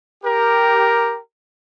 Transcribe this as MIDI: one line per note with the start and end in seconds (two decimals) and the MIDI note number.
0.24 1.18 67
0.24 1.18 70